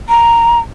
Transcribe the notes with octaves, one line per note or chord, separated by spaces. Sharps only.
A#5